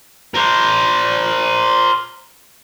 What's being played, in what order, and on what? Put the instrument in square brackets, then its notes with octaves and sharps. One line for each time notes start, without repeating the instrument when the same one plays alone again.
[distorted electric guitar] A#4 C5